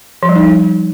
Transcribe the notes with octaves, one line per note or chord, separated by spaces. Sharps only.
F3
G3
D#4